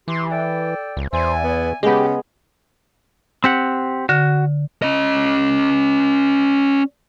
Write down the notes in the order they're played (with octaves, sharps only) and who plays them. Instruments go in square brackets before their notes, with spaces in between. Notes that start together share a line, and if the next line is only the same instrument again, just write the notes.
[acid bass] E3 [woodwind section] G4 C6
[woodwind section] A4 D5 G5
[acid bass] C#2
[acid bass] E2 [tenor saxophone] C5 [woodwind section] D5 E5 G#5
[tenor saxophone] B3
[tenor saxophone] C#3 [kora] G#3 B3 [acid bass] G4
[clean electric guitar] C4 G4 F#5
[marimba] D3 [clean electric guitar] F#4
[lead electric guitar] C#4 D#5